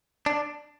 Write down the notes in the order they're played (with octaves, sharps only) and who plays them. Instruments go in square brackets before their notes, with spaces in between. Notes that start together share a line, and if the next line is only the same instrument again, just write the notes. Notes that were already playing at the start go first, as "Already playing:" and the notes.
[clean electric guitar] D4